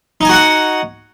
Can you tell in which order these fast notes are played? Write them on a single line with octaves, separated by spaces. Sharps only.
D#4 G#5 F#4 F#5